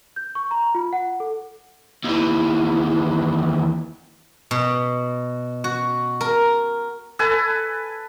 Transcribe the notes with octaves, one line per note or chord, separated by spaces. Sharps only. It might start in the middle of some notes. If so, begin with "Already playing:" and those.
G6
C#6
A#5
F4
F#5
A4
D#2 E3
B2
F#4
A#4
A4 B4 G#5